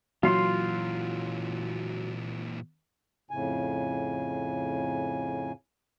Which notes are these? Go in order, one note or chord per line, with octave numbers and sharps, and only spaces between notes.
A#2 E3 F#3 F4 C6
F2 A2 C#3 G#5